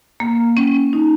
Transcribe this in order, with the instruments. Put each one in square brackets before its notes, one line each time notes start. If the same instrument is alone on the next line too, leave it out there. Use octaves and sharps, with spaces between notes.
[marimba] A#3
C#4
D#4